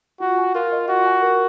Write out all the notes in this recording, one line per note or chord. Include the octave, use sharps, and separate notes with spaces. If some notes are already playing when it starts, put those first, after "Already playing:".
F4 F#4
G#5
F4 A#4
D#5
F4 F#4
G#5
A#4